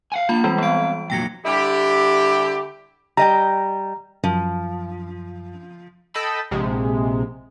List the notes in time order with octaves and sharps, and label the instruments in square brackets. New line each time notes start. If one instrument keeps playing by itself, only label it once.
[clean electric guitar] F5 F#5 G#5
[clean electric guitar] A#3 D4 [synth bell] F4 B5
[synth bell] E3 G3 G#3 [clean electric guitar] C4
[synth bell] B3 D7 [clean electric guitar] C4 F5
[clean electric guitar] F2 A#2 F#3 [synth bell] G5 A#6 C#7
[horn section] D3 G3 E4 G4
[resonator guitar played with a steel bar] G3 D#5 G5 [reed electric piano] A#5
[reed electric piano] F#2 [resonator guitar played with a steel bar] F3
[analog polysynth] A4 D#5 G5 A5 B5 E6
A#1 C3 G#3